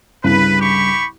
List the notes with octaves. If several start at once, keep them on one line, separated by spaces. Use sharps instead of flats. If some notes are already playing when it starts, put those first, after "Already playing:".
C2 G2 C#3 B4
G4 B5 C#6